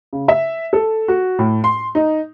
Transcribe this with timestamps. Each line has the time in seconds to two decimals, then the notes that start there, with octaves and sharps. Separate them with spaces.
0.13 C#3
0.28 E5
0.73 A4
1.08 F#4
1.39 A2
1.64 C6
1.95 D#4